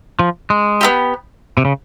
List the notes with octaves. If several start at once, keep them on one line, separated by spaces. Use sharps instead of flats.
F3
G#3
B3 E4 G4
C3
C#3